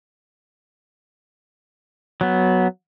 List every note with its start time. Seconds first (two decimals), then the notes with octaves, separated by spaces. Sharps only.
2.21 F#3 B3